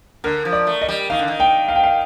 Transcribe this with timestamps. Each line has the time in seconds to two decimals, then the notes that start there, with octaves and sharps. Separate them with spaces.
0.24 D3 A#4
0.45 F3
0.52 D5
0.67 A3
0.82 D#5
0.88 G3
1.10 D#3 F5
1.19 D3
1.28 D#3
1.40 G5
1.69 F5
1.76 G5
1.84 F5